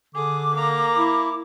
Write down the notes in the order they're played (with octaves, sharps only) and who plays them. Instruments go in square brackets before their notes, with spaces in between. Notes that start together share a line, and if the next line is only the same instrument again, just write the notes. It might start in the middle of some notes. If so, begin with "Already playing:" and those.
[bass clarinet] D3 [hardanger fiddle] G#4 [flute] D6
[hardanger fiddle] A#3 A#5
[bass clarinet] E4